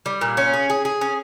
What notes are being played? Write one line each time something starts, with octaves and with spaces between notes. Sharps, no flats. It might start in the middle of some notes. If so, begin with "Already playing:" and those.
G3
A#2
C#4
G#4
G#4
G#4
C#4